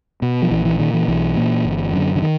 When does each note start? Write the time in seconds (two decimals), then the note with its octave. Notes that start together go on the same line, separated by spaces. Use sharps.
0.22 B2
0.42 F3
0.51 A#1 E3
0.65 E3
0.79 A#2 D#3
0.94 E3
1.08 B1 E3
1.37 A#2
1.65 G1
1.93 F#2 D3
2.16 D3
2.22 D#3